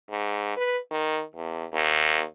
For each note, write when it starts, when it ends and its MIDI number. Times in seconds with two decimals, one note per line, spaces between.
0.10 0.52 44
0.57 0.78 71
0.91 1.22 51
1.36 1.65 40
1.73 2.23 39